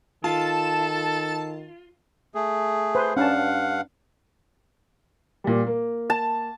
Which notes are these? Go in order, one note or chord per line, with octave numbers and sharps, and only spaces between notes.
D#3 F4 A4 A5
A3 G#4
B4 C5
G2 C#4 D4 F5 F#5 A5
A#2 G3
A#3
A5